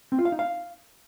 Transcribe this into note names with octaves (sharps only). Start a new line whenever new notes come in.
C4
F4
F5
D#4
F5